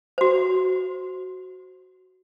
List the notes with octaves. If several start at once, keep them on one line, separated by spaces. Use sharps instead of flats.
F#4 C5